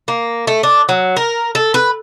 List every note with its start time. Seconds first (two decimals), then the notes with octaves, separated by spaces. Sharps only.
0.08 A#3
0.47 A3
0.63 D4
0.89 F#3
1.16 A#4
1.55 A4
1.74 B4